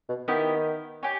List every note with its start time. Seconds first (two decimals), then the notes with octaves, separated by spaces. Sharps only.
0.09 B2
0.28 D#3 B3 E4 G4
1.03 G4 C#5 G#5